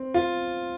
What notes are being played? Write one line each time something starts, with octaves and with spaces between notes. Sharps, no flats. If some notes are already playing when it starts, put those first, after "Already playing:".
Already playing: C4
F4